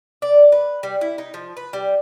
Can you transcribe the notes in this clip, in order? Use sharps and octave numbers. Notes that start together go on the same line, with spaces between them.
D5
B4
G3
E4
D#4
F3
B4
G3